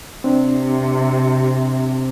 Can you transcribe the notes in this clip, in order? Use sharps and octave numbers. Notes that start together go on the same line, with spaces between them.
C3 C4 D4